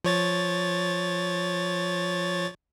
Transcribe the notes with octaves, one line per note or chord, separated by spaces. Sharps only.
F3 C#5 A6